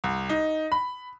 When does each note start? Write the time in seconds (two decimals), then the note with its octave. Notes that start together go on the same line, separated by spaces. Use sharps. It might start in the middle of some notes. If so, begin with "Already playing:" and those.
0.04 C2
0.29 D#4
0.72 B5